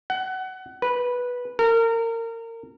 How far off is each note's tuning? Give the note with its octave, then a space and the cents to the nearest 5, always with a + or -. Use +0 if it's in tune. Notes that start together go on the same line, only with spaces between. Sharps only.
F#5 +25
B4 -10
A#4 -30